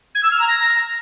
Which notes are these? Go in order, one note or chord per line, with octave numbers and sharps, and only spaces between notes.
G#6
E6
F6
A#5
A#6